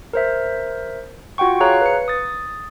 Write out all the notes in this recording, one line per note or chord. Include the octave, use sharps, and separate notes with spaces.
A#4 C5 E5
F4 F#4 F#5 G5 C#6
G#4 C#5 F5 A#5 F#6
B4 C#7
D#6 A6